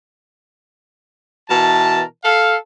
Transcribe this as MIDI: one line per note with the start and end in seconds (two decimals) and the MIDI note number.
1.49 2.02 47
1.49 2.02 52
1.49 2.02 70
1.49 2.02 81
2.24 2.55 69
2.24 2.55 77